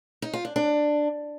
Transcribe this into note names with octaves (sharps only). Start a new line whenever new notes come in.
D#4
F4
D4
D4